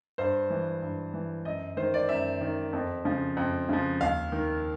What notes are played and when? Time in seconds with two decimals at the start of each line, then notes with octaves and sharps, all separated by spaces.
0.18 G2 C5
0.50 E3
0.82 G2
1.13 E3
1.45 F#2 D#5
1.77 D#3 C5
1.94 D5
2.09 F#2 E5
2.41 D#3
2.73 F2
3.05 C#3 F3
3.37 F2
3.69 C#3 F3
4.01 D#2 F5
4.32 D#3